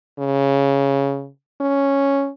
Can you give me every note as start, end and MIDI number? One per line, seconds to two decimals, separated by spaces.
0.19 1.29 49
1.61 2.30 61